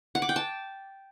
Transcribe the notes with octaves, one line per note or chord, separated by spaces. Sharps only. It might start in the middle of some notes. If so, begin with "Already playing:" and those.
F#5
D6
G5
A5